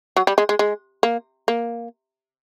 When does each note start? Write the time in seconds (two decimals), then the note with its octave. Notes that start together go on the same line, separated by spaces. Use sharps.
0.17 F#3
0.27 G3
0.38 G#3
0.49 G#3
0.59 G#3
1.03 A#3
1.48 A#3